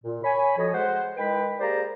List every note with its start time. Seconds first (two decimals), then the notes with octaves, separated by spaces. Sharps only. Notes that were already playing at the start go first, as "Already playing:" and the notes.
0.04 A#2
0.24 C#5 G#5 B5
0.57 F2 F3 F#4 A4 C#5 D#5
0.74 G#3 C5 F#5
1.16 D#3 G#3 E4 B4 G5 B5
1.59 A#3 G4 G#4 C5 D5 A#5